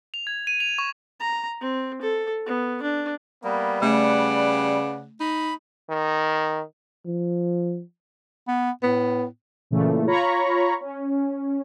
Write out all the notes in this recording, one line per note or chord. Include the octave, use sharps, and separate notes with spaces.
F7
G#6
D#7
F7
C#6
A#5
C4
A4
B3
D4
G3 A#3 B3
C#3 A3 B4 D5 F#5
D#4 B5
D#3
F3
B3
A2 B3
A#2 C#3 E3 A3
F4 C#5 A#5 B5 C#6
C#4